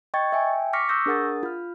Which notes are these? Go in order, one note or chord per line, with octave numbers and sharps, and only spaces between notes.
D#5 G5 C#6 G#6 A6
E5 G5 G#5
C#6 D6 F6 A#6 B6 C#7
C#6 D#6 E6 G6 A#6
D4 G#4 A#4 F#5 D#6 A6
F4 F6